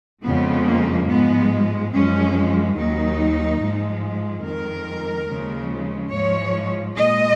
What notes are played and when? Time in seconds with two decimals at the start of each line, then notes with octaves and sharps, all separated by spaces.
0.23 F2 C#3 F3 G#3 B3
0.65 A#3
1.08 G#2 F3 G#3 B3
1.92 F#2 F3 G#3 C#4
2.75 D#2 D#3 F#3 D#4
3.59 G#2 F3 G#3
4.43 F2 D#3 G#3 A#4
5.28 D#2 C#3 F3 G#3
6.11 G#2 F3 G#3 C#5
6.96 A#2 G#3 D#5